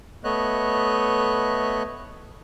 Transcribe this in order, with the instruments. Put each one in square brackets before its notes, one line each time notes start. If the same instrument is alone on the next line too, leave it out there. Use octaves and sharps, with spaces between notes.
[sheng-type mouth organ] A3 B3 C#5 D#5 F#6